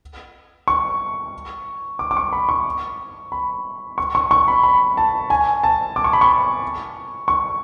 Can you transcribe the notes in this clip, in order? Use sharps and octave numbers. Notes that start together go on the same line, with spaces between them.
C#6
D6
D6
C#6
B5
C#6
B5
C#6
C#6
C#6
B5
B5
A5
G#5
A5
D6
C#6
B5
C#6
C#6